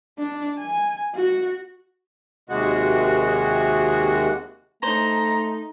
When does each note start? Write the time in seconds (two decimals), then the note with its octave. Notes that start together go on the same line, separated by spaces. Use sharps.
0.18 D4
0.58 G#5
1.15 F#4
2.49 D#2 C3 G#3 F#4
4.83 A3 D#4 C5 A#5